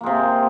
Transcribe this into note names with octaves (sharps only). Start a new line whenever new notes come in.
C3 G#3 A#3